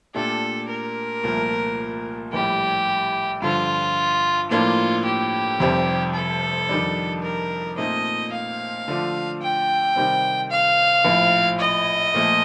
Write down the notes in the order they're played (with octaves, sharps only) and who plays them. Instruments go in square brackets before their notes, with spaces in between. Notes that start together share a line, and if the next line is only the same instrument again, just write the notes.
[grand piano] A#2 A3 D4 G4 [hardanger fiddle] A4
[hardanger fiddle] A#4
[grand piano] C2 A#2 F3 A3
[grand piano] A#1 A2 G3 [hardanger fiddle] G4
[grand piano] G2 D3 F3 [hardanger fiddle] F4
[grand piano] A2 F3 A#3 D4 [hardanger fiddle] F4
[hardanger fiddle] G4
[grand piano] F1 F2 C3 G3 C4
[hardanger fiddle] A4
[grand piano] F2 D#3 G3 D4
[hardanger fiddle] A#4
[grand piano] A#2 A3 C4 D#4 [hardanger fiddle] D#5
[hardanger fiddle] F5
[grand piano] D3 F3 A3 D4 F4
[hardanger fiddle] G5
[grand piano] C3 D#3 G3 C4
[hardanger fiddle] F5
[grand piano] A#1 A2 F3
[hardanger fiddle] D#5
[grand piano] A#2 F3 A3